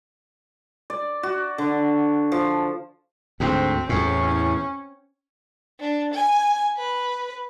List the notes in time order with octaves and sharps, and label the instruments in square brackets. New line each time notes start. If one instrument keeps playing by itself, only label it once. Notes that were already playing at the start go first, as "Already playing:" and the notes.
[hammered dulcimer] D5
F#4
D3
F3
[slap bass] D2 G#2 [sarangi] C4
[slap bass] E2 A2 [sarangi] C#4
[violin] D4
G#5
B4